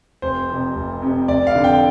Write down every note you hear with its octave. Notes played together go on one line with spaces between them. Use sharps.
F1 C5
F2 C3
F1
F2 C3
F1 D5
F5
F2 D3
G5